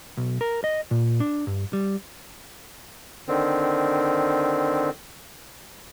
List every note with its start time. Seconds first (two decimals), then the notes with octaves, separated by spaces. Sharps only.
0.17 B1
0.41 A#4
0.64 D#5
0.91 A#2
1.20 D4
1.47 G2
1.73 G3
3.28 D3 D#3 C4